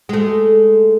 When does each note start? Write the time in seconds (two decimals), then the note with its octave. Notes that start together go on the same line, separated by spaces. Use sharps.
0.09 G#3 A3